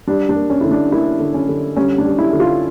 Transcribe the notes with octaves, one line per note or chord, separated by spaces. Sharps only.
G3 D4
D4
A#3
C#4
D3 E4
D4
A#3 E4
D3
C#4
D3
G3 C#4
D4
G3
E4
D3
F4